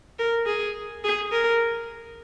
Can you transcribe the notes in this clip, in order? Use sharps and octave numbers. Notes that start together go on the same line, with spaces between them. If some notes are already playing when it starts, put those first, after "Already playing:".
A#4
G#4
G#4
A#4